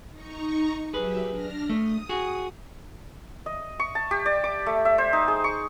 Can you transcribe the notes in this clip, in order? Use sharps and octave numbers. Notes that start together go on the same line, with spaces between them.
D#4 A#5 C#6
F#3 G4 G#4 B4 E5
D4 F6 A#6
A3 D#6
F#4 G#4
D#5
C#6
A5
G4
D5
D6
A3
E5
C5
D#4
G#4
C#6